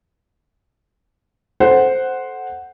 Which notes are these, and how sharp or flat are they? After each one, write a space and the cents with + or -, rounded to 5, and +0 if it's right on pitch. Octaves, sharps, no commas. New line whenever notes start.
A4 -10 C5 +0 F#5 +0